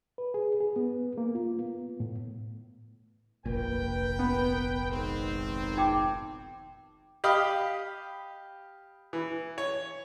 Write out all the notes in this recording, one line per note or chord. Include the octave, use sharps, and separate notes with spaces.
B4
G#4
G#4
B3
A#3
F4
B3
A2
F1 A#1 A#2 A#4 B4 G5
B3
G#1 D#3 C4
D#4 G5 D6
G4 D#5 F5 B5 D#6
E3
C#5